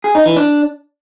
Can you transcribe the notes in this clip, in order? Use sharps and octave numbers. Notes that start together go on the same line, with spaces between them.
G#4
D#4
E3
D4